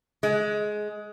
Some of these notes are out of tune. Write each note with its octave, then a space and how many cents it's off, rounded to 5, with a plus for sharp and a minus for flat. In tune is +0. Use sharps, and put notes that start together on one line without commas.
G#3 +15